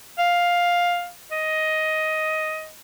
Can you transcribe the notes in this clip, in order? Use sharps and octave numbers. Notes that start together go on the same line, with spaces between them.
F5
D#5